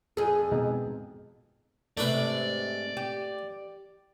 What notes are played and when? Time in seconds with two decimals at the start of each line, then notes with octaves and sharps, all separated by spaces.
0.17 F2 G#4 A4
0.52 B2 G#3 D#4
1.97 G#2 C3 A3 D4 B4 D5
2.97 G4